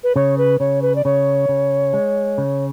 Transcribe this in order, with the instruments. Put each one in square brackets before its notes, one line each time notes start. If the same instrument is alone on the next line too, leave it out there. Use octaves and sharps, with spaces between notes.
[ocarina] B4
[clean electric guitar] C#3 [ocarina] C#5
[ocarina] B4
[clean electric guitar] C#3 [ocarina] C#5
[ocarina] B4
D5
[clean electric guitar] C#3 [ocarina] C#5
[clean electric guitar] C#3
G#3
C#3